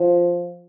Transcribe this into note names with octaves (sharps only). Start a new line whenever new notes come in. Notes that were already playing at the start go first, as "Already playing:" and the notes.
Already playing: F3